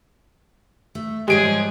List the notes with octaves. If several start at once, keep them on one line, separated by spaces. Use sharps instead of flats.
A3
G#2 F3 G3 G#3 G4 G#4 C#5 D7